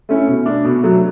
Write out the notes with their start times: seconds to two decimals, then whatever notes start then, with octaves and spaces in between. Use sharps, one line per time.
0.09 A3 C#4 E4
0.27 B2
0.45 A3 D4
0.65 B2
0.83 F#3 A3